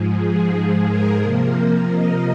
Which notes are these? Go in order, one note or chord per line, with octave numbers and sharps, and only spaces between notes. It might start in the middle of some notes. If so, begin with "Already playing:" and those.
Already playing: G#2 F3 G#3
G#4
A#4
C3 F3 A#3 A#4
A#4
D#5